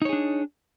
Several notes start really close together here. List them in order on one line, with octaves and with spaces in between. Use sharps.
D#4 C#5 G#4 D4